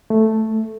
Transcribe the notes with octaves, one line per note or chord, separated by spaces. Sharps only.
A3